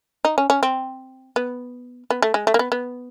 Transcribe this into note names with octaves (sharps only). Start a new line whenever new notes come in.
D#4
C#4
C#4
C4
B3
B3
A3
G#3
A3
A#3
B3
B3